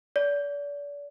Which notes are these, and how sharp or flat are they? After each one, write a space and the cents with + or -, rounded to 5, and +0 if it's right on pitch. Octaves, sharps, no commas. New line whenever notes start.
D5 -35